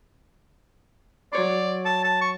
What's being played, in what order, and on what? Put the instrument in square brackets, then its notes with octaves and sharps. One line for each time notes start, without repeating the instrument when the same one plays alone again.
[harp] F#3 C#5 C6 [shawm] D5
[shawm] A5
A5
C#6